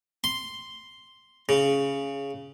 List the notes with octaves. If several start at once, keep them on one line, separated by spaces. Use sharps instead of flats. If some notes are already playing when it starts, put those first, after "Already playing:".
C6
C#3